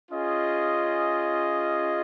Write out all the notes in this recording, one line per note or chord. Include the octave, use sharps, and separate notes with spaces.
C#4 F4 G#4 D#5